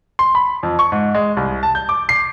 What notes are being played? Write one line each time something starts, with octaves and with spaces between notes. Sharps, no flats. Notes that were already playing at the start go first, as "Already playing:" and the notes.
C6
B5
F2
C#6
G#2
G#3
C2
A5
G6
D6
C7